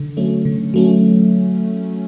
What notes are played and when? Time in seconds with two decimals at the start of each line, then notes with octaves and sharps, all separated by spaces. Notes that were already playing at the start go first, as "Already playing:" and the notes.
Already playing: D3
0.17 F#3 A3 C#4
0.45 D3
0.74 F#3 A3 C#4